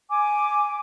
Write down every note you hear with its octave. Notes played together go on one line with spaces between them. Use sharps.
G#5 D6